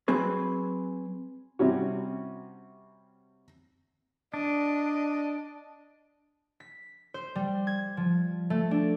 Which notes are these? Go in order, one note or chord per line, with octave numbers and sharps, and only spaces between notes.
F#3 C4 G#4 B4
C3 G3 C#4 F#4
D4 D#5
B6
C5
G3
G#6
F3
A3
D4